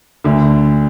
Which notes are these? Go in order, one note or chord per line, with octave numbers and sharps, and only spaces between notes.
D2 D3